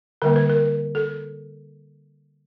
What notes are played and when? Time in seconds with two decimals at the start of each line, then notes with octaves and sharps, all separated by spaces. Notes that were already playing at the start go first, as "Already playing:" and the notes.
0.22 D3 G3 A#3 A#4
0.36 B4
0.50 A#4
0.95 A4